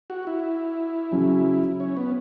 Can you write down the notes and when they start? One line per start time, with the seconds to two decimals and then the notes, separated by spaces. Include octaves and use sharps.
0.10 F#4
0.27 E4
1.12 C#3 F#3 C#4
1.80 C#4
1.97 B3